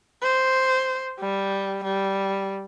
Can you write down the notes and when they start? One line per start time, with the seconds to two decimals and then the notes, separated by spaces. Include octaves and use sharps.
0.22 C5
1.20 G3
1.84 G3